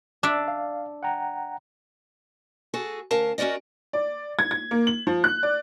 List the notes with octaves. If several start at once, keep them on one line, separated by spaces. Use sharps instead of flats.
D4 D5 E5
F5
F#5 G5 A#5
F#4 G#4 A4
D2 C#4 A#4 F5 A5
C#4 F#4 A#4 D5 D#5
D5
G#6
G#6
A#3
F#7
F3
F#6
D5